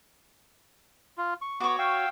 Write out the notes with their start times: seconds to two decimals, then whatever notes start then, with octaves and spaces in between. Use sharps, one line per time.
1.18 F4
1.42 C#6
1.60 B3 F#4 C#5 D6
1.79 F5 G5 E6